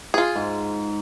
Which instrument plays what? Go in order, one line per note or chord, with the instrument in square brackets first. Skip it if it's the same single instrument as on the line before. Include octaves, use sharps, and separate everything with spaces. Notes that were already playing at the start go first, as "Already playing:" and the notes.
[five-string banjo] F4 G#4
[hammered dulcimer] G#2